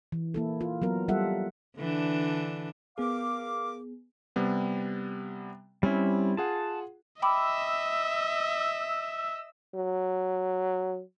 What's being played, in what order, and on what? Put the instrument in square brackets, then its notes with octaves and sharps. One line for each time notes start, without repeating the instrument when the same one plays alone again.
[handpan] E3
A#3 E4 A4
F4
F#3 B3 A#4
G3 F4 A4 E5 F#5
[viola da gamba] D3 E3 D4
[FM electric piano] B3 G#4 [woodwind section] A#4 F5 D6
[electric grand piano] C3 G3 B3
[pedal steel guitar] G3 C4 E4 [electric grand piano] C#4
[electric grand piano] F4 G#4 F#5 [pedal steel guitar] A5
[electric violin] D#5 E5 [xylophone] G5 B5 D6 [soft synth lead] E6
[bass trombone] F#3